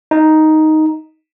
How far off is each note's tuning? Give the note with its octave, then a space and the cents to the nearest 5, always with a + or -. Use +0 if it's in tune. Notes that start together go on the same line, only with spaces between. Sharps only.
D#4 +5